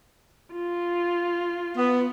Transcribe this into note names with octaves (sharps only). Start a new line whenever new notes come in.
F4
B3